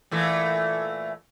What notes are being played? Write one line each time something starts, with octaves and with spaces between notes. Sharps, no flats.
A#2 E3 A3